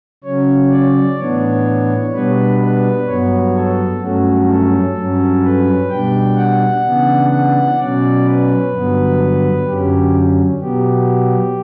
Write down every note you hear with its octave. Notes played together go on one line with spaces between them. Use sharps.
C#3 F#3 C#4 C#5
D5
A2 E3 B3 D4 C#5
B2 G3 B3 D4 B4
B4
G2 F#3 B3 C#5
A4
G2 F#3 A3 C#4 F#4
A4
G2 F#3 C#4
B4
B2 G3 D4 G5
F#5
C#3 E3 B3 D4
F#5
B2 F#3 C#4 D5
B4
G2 D3 F#3 B3
F#2 D3 F#3 C#4 G4
B2 F#3 B3 G4